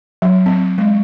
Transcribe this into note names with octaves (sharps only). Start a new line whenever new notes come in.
F#3
C4
G#3